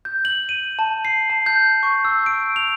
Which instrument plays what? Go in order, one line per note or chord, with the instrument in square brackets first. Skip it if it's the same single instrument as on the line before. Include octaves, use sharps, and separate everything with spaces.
[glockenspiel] G6
F#7
D#7
A5
C7
A5
G6
C#6
E6
D7
F7